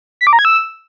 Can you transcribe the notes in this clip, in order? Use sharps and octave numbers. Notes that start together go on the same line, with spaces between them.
B6
D6
A#5
G#6
E6